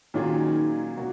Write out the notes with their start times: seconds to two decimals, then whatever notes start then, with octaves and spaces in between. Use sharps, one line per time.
0.14 A#2 D#3 F#3 C#4 F4 G#4
0.97 B2 A#3 C#4 F#4